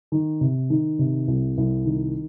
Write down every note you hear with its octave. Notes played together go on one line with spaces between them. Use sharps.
D#3
C3
D#3
C3
C2
C2
D#3